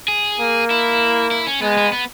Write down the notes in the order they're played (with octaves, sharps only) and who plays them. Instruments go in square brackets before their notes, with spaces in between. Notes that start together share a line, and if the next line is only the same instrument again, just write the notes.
[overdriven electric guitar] G#4
[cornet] A#3
[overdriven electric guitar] E4
E4
C#4
[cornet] G#3 [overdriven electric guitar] B3
[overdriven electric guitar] B3
B3